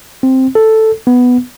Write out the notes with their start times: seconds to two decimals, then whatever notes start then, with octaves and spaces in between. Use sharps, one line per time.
0.23 C4
0.55 A4
1.07 B3